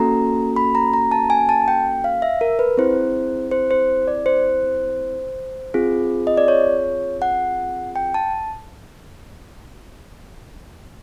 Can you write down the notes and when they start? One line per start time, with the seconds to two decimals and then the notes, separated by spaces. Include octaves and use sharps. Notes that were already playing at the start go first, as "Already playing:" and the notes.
Already playing: A#3 C#4 F#4 A4 A#5
0.56 B5
0.75 A#5
0.93 A#5
1.11 A5
1.30 G#5
1.49 A5
1.68 G5
2.04 F5
2.22 E5
2.41 A#4
2.59 B4
2.77 C4 E4 G#4 C5
3.51 C5
3.71 C5
4.07 D5
4.26 C5
5.74 C4 F4 G#4
6.27 D#5
6.37 D5
6.48 C#5
7.22 F#5
7.96 G5
8.14 A5